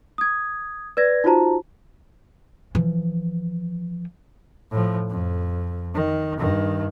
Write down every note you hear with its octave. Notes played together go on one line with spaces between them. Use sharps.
D#6 G#6
B4 D5 G#6 A#6
D#4 F4 F#4 C5 A5 A#5
E3 F3
A2 F3
F2
D#3
G2 D#3